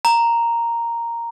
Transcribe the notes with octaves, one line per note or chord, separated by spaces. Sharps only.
A#5